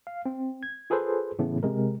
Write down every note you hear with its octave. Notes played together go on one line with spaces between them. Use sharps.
F5
C4
G#6
F4 G#4 A4 B4 C5
A2 C#3 E3 A3 B3
C3 G#3 A#4